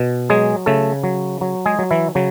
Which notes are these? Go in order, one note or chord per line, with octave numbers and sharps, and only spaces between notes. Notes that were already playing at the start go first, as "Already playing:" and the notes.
Already playing: B2
F#3 G#3 G#4
C#3 A3 A4
F#3
F#3
G#3 G#4
F#3
E3 E4
C#3 F#3